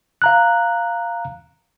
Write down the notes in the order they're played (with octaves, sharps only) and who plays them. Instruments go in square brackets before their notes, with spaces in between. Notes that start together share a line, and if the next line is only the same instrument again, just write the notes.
[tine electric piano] F5 A#5 F#6